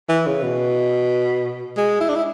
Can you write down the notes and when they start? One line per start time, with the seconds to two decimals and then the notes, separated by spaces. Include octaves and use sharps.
0.09 E3
0.27 C#3
0.43 B2
1.77 G#3
2.00 E4
2.09 D4
2.15 E4